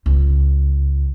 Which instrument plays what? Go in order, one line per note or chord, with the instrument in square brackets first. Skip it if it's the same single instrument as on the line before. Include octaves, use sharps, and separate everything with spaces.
[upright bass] C#2